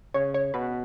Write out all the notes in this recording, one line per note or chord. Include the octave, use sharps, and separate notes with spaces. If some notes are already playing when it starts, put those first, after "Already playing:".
C#3 C#5
C#5
B2 B4